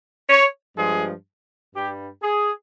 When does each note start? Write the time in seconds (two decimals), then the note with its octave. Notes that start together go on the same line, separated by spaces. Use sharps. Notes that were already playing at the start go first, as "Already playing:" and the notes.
0.30 C#5
0.77 G2 F3 G#3 G#4
1.75 G2 G3 G4
2.22 G#4